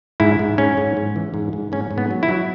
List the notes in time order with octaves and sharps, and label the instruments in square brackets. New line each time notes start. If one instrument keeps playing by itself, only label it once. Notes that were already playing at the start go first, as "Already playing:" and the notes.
[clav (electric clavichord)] G#2 E4
G#2
G#2 C#4
G#2
G#2
E3
G#2
G#2
G#2 C#4
G#2
B3
F#3
E4
F#3